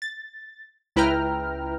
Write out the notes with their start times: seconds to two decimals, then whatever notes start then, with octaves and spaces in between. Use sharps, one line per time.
0.02 A6
0.96 C#2 E4 B4 G5 A#5 F6